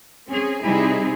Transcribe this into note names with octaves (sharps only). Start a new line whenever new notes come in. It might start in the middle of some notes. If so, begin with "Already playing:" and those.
C4 C#4 G#4
C3 G3 C4 D#4 E4 G#4